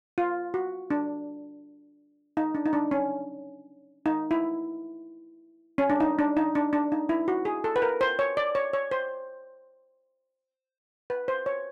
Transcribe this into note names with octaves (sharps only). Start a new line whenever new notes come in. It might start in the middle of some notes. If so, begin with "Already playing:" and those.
F4
F#4
D4
D#4
D4
D#4
D4
C#4
D#4
E4
C#4
D4
D#4
D4
D#4
D4
D4
D#4
E4
F#4
G#4
A4
B4
A#4
C5
C#5
D5
C#5
C#5
C5
B4
C5
C#5